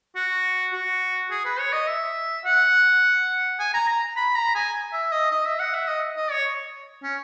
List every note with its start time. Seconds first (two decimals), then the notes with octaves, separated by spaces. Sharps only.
0.16 F#4
0.73 F#4
1.31 G#4
1.45 B4
1.59 C#5
1.73 D#5
1.88 E5
2.45 F#5
3.60 G#5
3.74 A#5
3.88 A#5
4.16 B5
4.35 A#5
4.55 G#5
4.93 E5
5.12 D#5
5.31 D#5
5.46 E5
5.60 F#5
5.74 E5
5.88 D#5
6.17 D#5
6.31 C#5
7.03 C#4